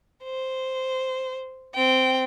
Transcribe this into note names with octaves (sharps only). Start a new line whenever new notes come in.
C5
C4 G5